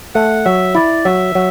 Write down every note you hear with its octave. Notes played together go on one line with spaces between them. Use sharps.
A3 F#5
F#3 E5
E4 D5
F#3 E5
F#3